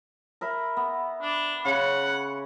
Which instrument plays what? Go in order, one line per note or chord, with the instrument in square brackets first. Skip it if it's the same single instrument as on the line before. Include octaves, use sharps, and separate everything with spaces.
[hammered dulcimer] A#4 E5 B5
B3
[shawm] D4
[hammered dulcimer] C#3 C#5 C6 [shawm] F#5